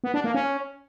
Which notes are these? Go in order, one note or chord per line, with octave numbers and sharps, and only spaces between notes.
B3
D4
A#3
C#4